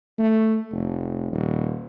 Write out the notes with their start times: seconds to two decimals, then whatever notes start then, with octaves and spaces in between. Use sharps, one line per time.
0.18 A3
0.73 F1
1.32 D#1